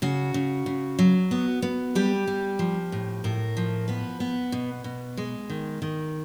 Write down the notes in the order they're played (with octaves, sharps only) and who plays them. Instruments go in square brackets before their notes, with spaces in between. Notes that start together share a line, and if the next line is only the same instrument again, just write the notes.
[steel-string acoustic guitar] C#3 F#4
C#3
C#3
F#3
B3
B3
G3 G4
G3
F3
A2
A2 A#4
F3
B3 B4
B3
B2
B2
G#3
D#3
D#3